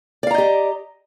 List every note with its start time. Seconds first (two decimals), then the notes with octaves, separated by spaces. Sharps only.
0.23 D5
0.27 F5
0.31 A#5
0.34 D#5
0.38 G4